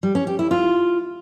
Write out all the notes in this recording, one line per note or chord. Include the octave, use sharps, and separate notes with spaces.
G3
C#4
G4
E4
F4